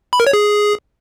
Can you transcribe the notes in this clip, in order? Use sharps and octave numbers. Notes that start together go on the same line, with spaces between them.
B5
A#4
C#5
G#4